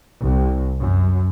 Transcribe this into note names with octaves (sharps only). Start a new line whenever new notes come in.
C2
F#2